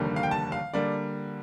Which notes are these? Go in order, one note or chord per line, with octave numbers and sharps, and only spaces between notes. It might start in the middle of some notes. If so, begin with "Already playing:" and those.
Already playing: F1 D#2 D3 G3 A#3
F5
G5
A5
F5
D3 G3 A#3 D5